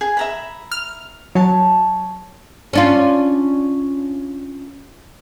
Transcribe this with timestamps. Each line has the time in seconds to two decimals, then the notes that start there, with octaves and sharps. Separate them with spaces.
0.01 G#4
0.17 E5 A#5 B5
0.72 F6
1.35 F#3 C#5 A5
2.73 C#4 D4 F4